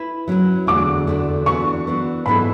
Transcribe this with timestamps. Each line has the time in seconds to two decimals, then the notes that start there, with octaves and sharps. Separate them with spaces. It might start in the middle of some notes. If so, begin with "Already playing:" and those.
Already playing: E4 B4
0.28 F#3 C#4 E4 B4
0.67 E2 D3 A3 D4 F#4 D6
1.07 E2 D3 A3 D4 F#4
1.46 E3 B3 D4 F#4 C#6
1.87 E3 B3 D4 F#4
2.26 G#2 E3 B3 E4 A4 B5